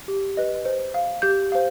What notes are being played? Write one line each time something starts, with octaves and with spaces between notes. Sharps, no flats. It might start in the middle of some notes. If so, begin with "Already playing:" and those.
G4
B4 D#5
C5
F5
G4 G6
C5 F5